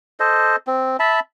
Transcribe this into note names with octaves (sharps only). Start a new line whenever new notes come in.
A4 C5 D#5
C4
E5 A5 B5